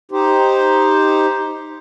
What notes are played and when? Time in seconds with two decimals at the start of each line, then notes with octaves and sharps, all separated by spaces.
0.11 D#4 G4 C5